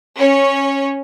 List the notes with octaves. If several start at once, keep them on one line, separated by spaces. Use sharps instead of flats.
C#4 C#5